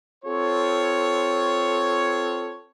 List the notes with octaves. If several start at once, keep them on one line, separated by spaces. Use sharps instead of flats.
C4 F4 A4 C#5